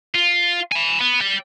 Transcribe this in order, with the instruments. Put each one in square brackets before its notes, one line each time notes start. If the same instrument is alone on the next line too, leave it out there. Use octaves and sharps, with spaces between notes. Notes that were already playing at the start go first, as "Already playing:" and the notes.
[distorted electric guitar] F4
G#5 B5
B3
D5 G5